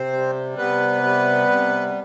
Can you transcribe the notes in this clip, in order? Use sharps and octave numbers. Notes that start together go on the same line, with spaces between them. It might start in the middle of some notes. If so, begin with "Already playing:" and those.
Already playing: C3 C4 C5
G3
C3 B3 B4
G3
C3